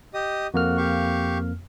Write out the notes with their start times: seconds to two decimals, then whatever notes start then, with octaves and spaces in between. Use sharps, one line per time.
0.14 G4 D#5 D#6
0.54 F2 A#3 F#4 F6
0.77 G4 F5 C#6